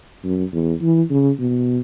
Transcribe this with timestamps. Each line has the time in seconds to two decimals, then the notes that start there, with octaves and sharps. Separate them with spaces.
0.24 F#2
0.53 E2
0.82 E3
1.10 C#3
1.39 B2